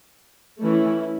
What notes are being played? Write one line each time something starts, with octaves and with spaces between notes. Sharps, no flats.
E3 A3 C#4 E4